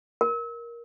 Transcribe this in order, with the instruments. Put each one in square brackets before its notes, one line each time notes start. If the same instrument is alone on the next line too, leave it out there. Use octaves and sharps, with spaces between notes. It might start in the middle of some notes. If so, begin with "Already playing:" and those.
[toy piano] A#4